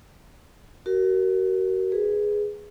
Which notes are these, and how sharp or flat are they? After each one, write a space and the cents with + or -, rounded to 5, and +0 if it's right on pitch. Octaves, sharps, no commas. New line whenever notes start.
F#4 +35 A#4 +0
G#4 +0 B4 +0